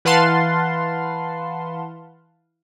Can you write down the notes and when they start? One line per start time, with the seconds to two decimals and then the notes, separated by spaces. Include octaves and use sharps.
0.05 E3 B4 F5 F#5 A5 C6